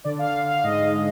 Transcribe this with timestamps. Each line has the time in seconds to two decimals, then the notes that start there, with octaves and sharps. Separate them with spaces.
0.04 D3 D5
0.19 F5
0.24 D3
0.44 D3
0.49 F5
0.64 G#2 D#5
0.82 G#3